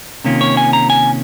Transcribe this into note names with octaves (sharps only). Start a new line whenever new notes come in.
C3 D#3 A#3 C#4 F4
C#5
G#5
A#5
G#5